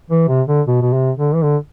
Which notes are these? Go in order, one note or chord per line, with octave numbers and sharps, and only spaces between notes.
E3
C3
D3
B2
B2
C3
D3
E3
D3